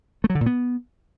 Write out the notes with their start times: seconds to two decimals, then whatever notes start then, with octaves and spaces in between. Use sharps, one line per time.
0.24 A3
0.30 F#3
0.35 D3
0.41 A#2
0.46 B3